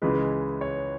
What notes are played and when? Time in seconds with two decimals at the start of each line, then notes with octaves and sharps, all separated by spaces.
0.02 C#2 C#3 E3 G#3 B4
0.61 C#5